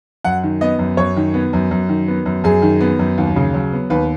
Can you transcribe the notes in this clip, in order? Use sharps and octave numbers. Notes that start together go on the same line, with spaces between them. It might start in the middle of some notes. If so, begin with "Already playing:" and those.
F#2 F#5
D#3
B3 D#5
F#2
F#2 C#5
D#3
B3
F#2
F#2
D#3
B3
F#2
F#2 G#4
D#3
B3
F#2
D#2
C#3
F#3
B3
D#2 B4